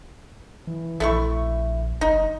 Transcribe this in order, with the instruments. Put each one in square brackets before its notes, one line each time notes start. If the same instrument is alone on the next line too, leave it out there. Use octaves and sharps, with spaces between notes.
[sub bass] E3
[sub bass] A#1 [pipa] A3 E4 C#6
[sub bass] F#1 [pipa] D#4